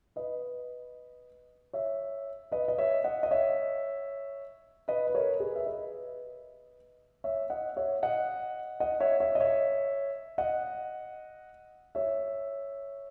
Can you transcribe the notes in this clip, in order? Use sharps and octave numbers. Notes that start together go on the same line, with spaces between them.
B4 D#5
C#5 E5
B4 D#5
D#5
C#5 E5
D#5 F#5
D#5
C#5 E5
B4 D#5
B4
A#4 C#5
G#4 B4
E5
B4 D#5
C#5 E5
D#5 F#5
C#5 E5
D#5 F#5
D#5 F#5
C#5 E5
C#5 E5
D#5
C#5 E5
D#5 F#5
C#5 E5